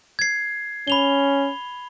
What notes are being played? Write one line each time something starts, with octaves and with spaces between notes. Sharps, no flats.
G#6 C7
C#4 B5 F7 G7